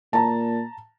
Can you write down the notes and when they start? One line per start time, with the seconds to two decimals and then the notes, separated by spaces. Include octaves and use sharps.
0.13 A#2 A5 A#5